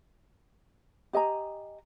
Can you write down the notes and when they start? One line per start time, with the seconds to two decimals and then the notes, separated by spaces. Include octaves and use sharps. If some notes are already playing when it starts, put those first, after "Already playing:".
1.13 G4 D#5 G#5 A#5